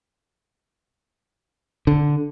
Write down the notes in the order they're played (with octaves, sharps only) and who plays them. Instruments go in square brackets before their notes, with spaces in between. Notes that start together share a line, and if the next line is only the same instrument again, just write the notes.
[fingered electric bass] D3